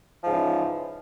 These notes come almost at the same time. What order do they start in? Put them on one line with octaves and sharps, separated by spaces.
F3 G#2 C#3 E3